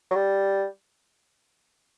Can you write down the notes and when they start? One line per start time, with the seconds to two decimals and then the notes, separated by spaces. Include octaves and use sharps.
0.11 F#3
0.15 G3